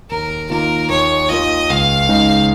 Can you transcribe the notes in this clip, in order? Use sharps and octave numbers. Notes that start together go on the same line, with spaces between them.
D#2 A#4
D#3 A#3 F4 A#4
D#2 C#5
D#3 A#3 F4 D#5
C#2 F5
C#3 G#3 D#4